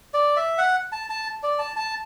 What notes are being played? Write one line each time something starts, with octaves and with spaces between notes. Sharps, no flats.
D5
E5
F#5
A5
A5
D5
A5
A5